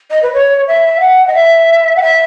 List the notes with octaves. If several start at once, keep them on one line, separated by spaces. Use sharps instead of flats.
D#5
B4
C#5
E5
F#5
D#5
E5
F#5
E5